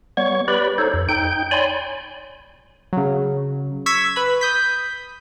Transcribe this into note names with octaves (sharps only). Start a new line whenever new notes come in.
G3 B3 C#5 C#6
G4 B4 D5 B5
D#4 A4 C5 C#5
F2
D#4 G5 G6
C#5 D5 G#5 B5 C6
C#3 F#3
C#6 E6 G#6 B6
B4 B5
D#6 G6 B6